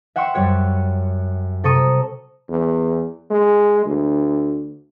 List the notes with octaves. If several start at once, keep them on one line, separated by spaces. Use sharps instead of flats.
E5 F#5 G5 C6 C#6
F#2 G3 G4 C#5 F#6
C3 A4 A#5 C#6 D#6 D#7
E2
G#3
D2